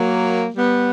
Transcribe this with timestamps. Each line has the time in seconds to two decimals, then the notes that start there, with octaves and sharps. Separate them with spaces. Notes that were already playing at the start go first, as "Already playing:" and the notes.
Already playing: F#3 A#3
0.55 G3 B3